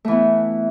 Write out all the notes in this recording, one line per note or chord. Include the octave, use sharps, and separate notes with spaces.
E3 A3 B3